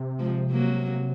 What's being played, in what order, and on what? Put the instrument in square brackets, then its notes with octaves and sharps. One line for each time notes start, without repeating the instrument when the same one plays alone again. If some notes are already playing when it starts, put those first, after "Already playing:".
Already playing: [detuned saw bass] C3
[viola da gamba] F3 G#3
F#3 A#3